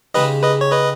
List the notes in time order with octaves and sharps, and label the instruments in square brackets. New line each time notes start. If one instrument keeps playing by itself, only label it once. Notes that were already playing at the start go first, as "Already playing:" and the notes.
[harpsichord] C#3 G#3 D#4 G4 [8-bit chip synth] B4 D#5
[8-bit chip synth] B4 D#5
C#5
B4 D#5